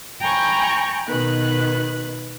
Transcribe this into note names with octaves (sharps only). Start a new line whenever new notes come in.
G5 G#5 A#5 B5 C#6 G6
B2 D#3 B4 F#6